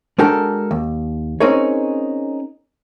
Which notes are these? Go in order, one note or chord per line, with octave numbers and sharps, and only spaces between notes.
G#3 D4 F#4 A4 A#4 G5
D#2
C4 C#4 D#4 G#4 A#4 C#5